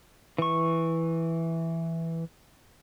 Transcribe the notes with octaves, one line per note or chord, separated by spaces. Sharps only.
E3 C#6